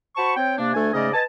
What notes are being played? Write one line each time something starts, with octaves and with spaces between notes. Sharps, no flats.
F#4 C5 A5 B5 C#6
C4 C#5 G5
C3 A#3 D4
D2 A3 D4 A4 G#5
G#2 C#3 A3 C#4 D5 D#5
B4 D#5 G#5 A5